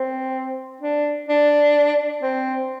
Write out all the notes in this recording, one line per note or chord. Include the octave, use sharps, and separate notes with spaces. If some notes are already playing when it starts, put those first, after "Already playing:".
Already playing: C4
D4
D4
C4